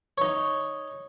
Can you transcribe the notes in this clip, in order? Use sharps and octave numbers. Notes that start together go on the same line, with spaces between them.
D#4 C#5